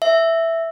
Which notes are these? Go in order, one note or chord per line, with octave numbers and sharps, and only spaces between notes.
E5